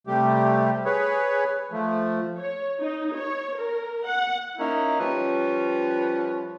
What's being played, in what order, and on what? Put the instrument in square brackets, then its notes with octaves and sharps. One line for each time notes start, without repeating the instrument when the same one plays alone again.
[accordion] C3 G3 A3 G4
G#4 B4 C#5
F3 A3
[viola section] C#5
D#4
C#5
A#4
F#5
[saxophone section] A#3 C#4 D#4 E4
F3 G3 C#4 B4